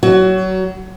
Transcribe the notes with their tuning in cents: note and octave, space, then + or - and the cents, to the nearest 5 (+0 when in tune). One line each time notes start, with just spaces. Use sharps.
F#3 +25 F#4 +20